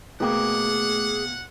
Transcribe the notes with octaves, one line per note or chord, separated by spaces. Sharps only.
B2 A3 A#3 G#4 F#5 G5 D6